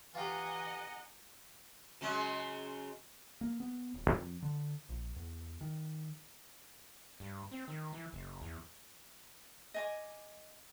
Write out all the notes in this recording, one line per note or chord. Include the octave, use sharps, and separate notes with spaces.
E3 F4 G4 D#5 F#5 G#5 A#5
C#3 F#3 G#3
A#3
B3
D#1
F2
D3
A#1
E2
D#3
G2
C4
D#3
E3
F#1
E2
D#5 G#5 D6